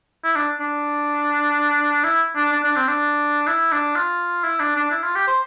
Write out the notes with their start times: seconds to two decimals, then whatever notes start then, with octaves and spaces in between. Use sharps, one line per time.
0.24 E4
0.36 D4
0.60 D4
2.05 E4
2.36 D4
2.52 D4
2.64 D4
2.76 C4
2.88 D4
3.47 E4
3.72 D4
3.96 F4
4.44 E4
4.60 D4
4.76 D4
4.91 E4
5.03 F4
5.15 G4
5.27 C5